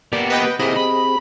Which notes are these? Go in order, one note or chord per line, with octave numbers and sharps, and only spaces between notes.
A#3 B3 G4 D5
B4 D#5 G5
A#3 C4 E4 G4 G#4 D#5
B5